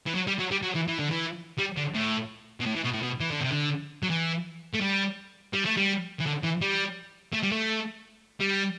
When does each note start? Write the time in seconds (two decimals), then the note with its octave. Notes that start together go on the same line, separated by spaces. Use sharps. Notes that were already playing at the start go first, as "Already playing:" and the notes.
0.07 E3
0.15 F#3
0.27 G3
0.39 F#3
0.51 G3
0.63 F#3
0.75 E3
0.88 E3
0.99 D3
1.10 E3
1.59 G3
1.77 D3
1.95 A2
2.60 B2
2.66 A2
2.76 E3
2.84 B2
2.94 A2
3.03 B2
3.20 E3
3.31 D3
3.40 C3
3.51 D3
4.03 F#3
4.10 E3
4.74 A3
4.81 G3
5.54 G3
5.66 A3
5.77 G3
6.20 E3
6.26 D3
6.43 E3
6.61 G3
7.33 A3
7.43 G3
7.51 A3
8.40 G3